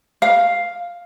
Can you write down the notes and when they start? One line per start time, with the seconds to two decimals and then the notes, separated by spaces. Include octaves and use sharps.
0.22 F5